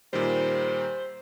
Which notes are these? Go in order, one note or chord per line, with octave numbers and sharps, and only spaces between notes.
A#2 D#3 G3 C5